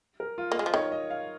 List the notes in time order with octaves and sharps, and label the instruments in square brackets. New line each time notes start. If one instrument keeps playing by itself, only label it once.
[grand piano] A#4
F4
[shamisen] A#3
[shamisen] G#3 [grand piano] D#5
[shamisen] F3
[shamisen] D#3 [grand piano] C#5
[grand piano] D#5
F5